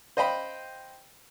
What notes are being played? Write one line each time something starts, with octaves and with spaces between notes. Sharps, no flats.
C5 D#5 F5 G5 B5